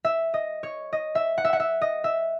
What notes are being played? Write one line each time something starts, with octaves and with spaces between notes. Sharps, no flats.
E5
D#5
C#5
D#5
E5
F#5
E5
F#5
E5
D#5
E5